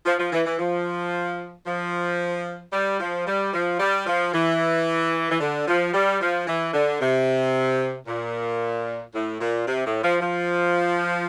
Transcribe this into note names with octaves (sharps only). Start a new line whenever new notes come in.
F3
F3
E3
E3
F3
F3
G3
F3
G3
F3
G3
F3
E3
E3
D3
F3
G3
F3
E3
D3
C3
A#2
A2
A#2
C3
A2
F3
F3